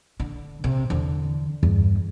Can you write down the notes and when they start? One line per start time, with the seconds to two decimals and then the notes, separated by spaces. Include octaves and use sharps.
0.20 D3
0.64 C3
0.90 E2 D3
1.63 E2 G2